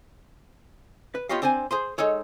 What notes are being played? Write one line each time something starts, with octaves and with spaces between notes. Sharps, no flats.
B4
B3 F4 G4 C#5 D#5 F5
C4 D4 C5 D5 G#5
G#4 C5 C6
G#3 D#4 A4 C#5